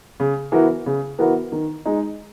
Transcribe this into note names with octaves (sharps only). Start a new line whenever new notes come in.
C#3
E3 B3 F#4 A#4
C#3
E3 B3 F#4 A#4
D#3
G#3 D#4